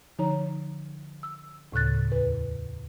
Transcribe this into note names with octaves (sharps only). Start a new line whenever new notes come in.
D3 F3 D#4 C#5 A#5
E6
D2 A2 C#3 F#6 A6
E2 B4